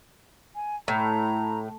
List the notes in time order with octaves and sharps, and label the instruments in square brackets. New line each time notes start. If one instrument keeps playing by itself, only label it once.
[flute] G#5
[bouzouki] A2 [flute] A#5